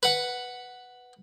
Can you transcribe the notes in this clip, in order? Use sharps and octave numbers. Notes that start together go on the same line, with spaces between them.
B4 F#5